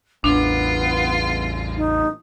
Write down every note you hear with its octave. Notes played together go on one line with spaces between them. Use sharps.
A1 E2 B3 D4 F4
D#4